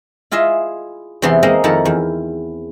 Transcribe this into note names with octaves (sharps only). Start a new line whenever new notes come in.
E4 F4 G#4 D#5 E5
E2 C3 E3 B3 A5 C6
G#3 A#3 C4 A#4 C5 D#5
F2 D#3 E4 A#4 F#5 A5
E2